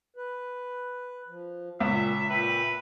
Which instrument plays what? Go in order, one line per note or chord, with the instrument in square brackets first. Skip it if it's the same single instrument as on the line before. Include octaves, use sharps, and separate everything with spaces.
[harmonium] B4
F3
[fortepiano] C#2 [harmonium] A#2 [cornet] E5
[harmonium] A#2 E5 G5 [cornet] B4